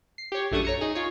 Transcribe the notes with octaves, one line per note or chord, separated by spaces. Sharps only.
C7
G4 C#5
A#1 F#2 A3 D4 C#6 D#6
C#5 A#5 C#7
D#4 G#4
F4 C#5